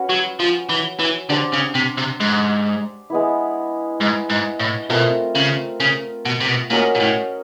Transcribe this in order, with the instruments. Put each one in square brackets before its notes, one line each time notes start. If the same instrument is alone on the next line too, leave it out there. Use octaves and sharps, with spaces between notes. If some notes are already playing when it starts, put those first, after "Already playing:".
Already playing: [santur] C#4 F#4 B4
[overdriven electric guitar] F#3
F3
E3
E3
[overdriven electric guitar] D3 [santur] D4 G4 C5
[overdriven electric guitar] C#3
C3
C3
G#2
[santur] G#3 B3 E4
[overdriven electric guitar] G#2
G#2
A2
[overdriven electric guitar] B2 [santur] A3 C4 F4 A#4
[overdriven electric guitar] C#3
C#3
B2
C3
B2
[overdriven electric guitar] A#2 [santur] C#4 F#4 A#4 D#5
[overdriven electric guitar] A#2
A2